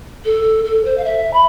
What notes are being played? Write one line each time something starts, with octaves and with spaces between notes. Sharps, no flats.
A4
A4
C5
F5
E5
B5